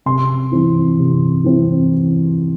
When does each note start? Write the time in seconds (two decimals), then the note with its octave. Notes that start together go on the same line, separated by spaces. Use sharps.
0.06 C3 C6
0.52 E3 C4 E4
0.99 C3
1.44 E3 C4 E4